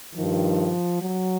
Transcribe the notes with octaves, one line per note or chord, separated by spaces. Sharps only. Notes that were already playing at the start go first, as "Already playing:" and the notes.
G2 D#3 F3
F#3